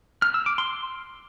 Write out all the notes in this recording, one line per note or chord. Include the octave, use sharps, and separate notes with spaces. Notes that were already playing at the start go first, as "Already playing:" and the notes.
F6
E6
D6
C6